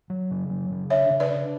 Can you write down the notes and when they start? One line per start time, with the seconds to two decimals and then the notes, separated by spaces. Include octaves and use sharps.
0.10 F#3
0.31 C#3
0.50 F#3
0.71 C#3
0.90 D4 C#5 E5
1.10 C#3
1.20 B4 D5
1.31 D4